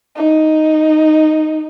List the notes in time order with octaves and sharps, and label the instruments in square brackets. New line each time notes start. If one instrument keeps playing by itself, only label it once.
[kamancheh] D#4